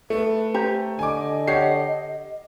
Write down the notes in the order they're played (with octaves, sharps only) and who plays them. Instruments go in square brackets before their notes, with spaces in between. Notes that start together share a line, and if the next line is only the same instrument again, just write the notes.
[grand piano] A3 [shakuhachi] B4
[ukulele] G4 C5 A#5
[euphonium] D3 [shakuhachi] D#5 [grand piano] G#5 D6
[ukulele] G4 C#5 F#5 [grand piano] C7